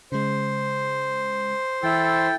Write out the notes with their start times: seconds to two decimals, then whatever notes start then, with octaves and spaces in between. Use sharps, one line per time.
0.12 C#3 G#3 C5
1.83 E3 E4 A4 G5